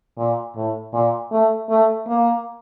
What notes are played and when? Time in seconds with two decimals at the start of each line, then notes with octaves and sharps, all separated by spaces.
0.18 A#2
0.56 A2
0.93 A#2
1.31 A3
1.69 A3
2.07 A#3